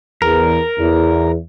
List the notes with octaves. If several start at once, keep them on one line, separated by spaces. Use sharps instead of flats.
E2 A#4
E2